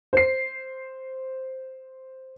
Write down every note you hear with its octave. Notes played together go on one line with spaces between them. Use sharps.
C5 C7